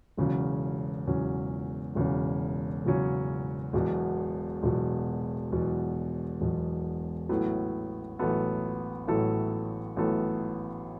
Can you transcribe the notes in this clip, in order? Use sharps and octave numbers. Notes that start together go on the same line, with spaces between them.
E1 E2 C#3 F#3 C#4
E1 E2 C#3 F#3 C#4
E1 E2 C#3 F#3 C#4
E1 E2 C#3 F#3 C#4
E1 E2 B2 F#3
E1 E2 B2 F#3
E1 E2 B2 F#3
E1 E2 B2 F#3
A1 A2 F#3 B3 A4
A1 A2 F#3 B3 A4
A1 A2 F#3 B3 A4
A1 A2 F#3 B3 A4